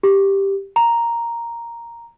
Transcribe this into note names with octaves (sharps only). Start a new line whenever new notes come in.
G4
A#5